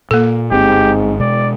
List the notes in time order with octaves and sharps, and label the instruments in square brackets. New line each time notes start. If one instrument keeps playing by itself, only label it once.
[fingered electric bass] A#2 [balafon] A#3 A4
[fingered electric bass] G1 C4 [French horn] G#2 [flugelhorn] G4
[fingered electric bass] B2 G#3 [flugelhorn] D5